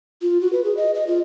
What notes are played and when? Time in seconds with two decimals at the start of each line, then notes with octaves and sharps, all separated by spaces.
0.22 F4
0.41 F#4
0.53 B4
0.64 G#4
0.77 D#5
0.94 D#5
1.07 F4